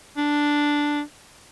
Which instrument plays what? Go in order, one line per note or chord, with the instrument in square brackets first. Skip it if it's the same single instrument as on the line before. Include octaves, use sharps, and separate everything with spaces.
[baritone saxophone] D4